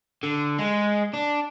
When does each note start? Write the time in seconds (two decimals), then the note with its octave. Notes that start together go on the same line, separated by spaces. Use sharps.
0.23 D3
0.58 G#3
1.13 D4